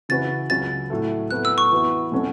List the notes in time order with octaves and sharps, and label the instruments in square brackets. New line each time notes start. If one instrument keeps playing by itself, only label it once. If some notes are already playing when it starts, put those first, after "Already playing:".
[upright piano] C#3 E3 C#4 F#4 B4 [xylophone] A6
[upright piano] C#2 C#3 F#3 C#4 [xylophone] A6
[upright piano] A2 F#3 A3
[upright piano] A2 F#3 B3 A4 [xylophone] F#6
[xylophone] E6
C#6
[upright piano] E2 E3 B3 F#4
B2 F#3 C#4 F#4 A4